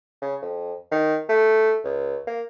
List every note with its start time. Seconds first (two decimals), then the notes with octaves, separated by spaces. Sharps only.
0.22 C#3
0.42 F2
0.91 D#3
1.29 A3
1.84 C#2
2.27 A#3